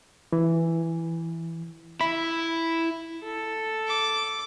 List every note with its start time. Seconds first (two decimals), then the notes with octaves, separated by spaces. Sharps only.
0.32 E3
2.01 E4 B5
3.23 A4
3.88 D6